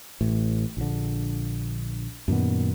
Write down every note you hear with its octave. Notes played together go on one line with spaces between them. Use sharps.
A1 A2
A#1 D3
F#2 A#2 D#3 B3